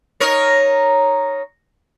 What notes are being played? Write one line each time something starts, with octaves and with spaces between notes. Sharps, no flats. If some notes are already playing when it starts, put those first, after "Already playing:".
D#4 A#4 C#5